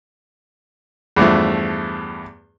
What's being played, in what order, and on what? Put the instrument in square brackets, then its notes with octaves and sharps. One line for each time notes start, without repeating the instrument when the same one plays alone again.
[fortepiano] E2 G2 F3 A3